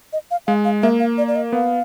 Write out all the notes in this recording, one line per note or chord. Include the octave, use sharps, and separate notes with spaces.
D#5
F5
G#3 F5
F5
A#3 E5
F5
D5
D5
D#5
B3 F5